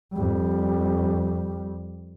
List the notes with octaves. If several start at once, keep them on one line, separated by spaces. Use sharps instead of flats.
F2 G3